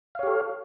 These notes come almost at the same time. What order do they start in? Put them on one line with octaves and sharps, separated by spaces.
F5 C#5 G4 A4